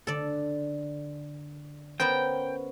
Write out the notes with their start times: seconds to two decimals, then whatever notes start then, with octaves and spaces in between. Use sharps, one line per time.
0.07 D3 A4 D5
2.00 B3 C#4 A#4 C5 G5